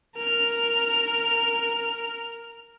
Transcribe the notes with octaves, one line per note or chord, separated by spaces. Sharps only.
A#4 F6